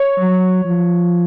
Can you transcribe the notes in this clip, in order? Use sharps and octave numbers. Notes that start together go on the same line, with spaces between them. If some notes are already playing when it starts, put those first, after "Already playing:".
Already playing: C#5
F#3
F3